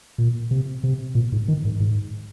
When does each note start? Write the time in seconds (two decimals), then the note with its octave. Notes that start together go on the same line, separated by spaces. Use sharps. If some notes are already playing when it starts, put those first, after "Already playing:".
0.18 A#2
0.51 C3
0.84 C3
1.15 A#2
1.32 G#2
1.48 D#3
1.65 G#2
1.80 G#2